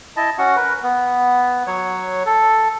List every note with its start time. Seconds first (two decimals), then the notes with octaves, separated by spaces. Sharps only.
0.16 E4 D#5 A5
0.38 C#4 F#4 F#5
0.56 A#4 B4
0.83 B3
1.67 F#3 C#5
2.26 A4